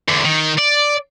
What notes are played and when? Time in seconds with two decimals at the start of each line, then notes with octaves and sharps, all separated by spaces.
0.08 E2 D3
0.25 D#3
0.59 D5